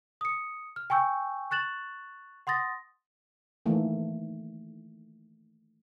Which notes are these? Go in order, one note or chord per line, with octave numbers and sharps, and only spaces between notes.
D#6 C#7
F6
G5 G#5 C#6 E6 G6
C#6 F#6 A6 E7 F#7
F#5 C6 D#6 A6 A#6
D#3 E3 A3 A#3